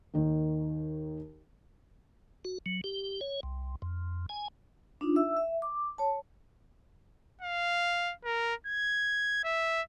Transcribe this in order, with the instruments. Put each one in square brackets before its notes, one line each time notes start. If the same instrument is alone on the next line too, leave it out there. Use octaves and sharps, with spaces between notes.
[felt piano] D#2 D#3
[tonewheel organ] F#4
F#3
G4
C#5
C2
F2
G#5
[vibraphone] D4 D#4 F4
E5 E6
E5
D6
C#5 A5
[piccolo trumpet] F5
A#4
G#6
E5